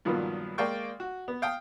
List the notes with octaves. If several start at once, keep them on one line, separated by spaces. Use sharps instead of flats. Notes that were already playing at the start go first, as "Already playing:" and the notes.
G2 A#2 D#3 F3 F#3 B3
G#3 A#3 D5 F5 G5 C#6
F#4
B3
F5 G5 D#6